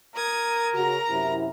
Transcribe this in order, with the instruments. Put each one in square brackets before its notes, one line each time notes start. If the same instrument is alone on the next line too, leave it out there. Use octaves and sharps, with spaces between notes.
[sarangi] A#4 [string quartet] D#6 G#6
[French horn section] C#3 F#4 [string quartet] A#5
[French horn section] F#2 C3 E4